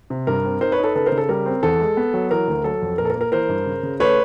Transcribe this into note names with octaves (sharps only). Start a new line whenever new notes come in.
C3
G2 A#4
C4
D#4 A#4 C5
B4 C#5
D#4
A4 B4
C#3 A4 B4
A#4 C5
C#3
A4
G3 A#4
C4
E2 A4
G#3
B3
F#3
E3 A#4
D2
F#3 A4
F2
A#2 A#4
A4
A#4
A#3
A#4
E3 A#4 C5
G2
C#3
C#3
A3 B4 C#5